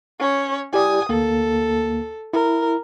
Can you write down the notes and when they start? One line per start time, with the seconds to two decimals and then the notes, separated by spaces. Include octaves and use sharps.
0.20 C#4 C#5
0.73 E4 G4 D5 G#5 D#6
1.09 D2 A#3 A4
2.33 E4 A#4